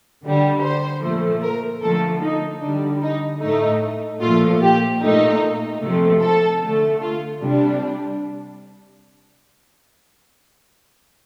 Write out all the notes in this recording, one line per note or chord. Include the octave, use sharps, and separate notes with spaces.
D3 G3
C5
A#2 F3 A3
A#4
D3 F3 A3 A4
D#4
D3 G3 D4
D#4
A2 A3 D#4
A#2 F3 A3 F4
G4
A#2 A3 D#4
C3 F3 A3
A4
D3 A3
F4
C3 G3 D4